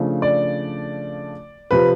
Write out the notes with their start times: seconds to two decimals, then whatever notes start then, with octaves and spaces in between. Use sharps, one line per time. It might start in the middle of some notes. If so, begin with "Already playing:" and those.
Already playing: C#3 F3 A3 D4
0.22 D5
1.71 C3 F3 B4